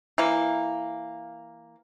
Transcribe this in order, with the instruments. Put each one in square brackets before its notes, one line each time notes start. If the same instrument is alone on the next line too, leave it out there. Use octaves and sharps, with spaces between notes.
[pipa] E3 A#3